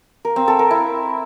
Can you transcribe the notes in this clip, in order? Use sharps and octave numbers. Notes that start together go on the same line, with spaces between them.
A#4
C4
A4
A#4
E4